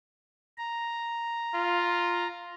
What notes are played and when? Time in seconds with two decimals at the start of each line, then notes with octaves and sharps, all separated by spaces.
0.58 A#5
1.55 F4